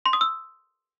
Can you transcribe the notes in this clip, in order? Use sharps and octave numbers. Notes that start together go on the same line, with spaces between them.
C6
D#6
E6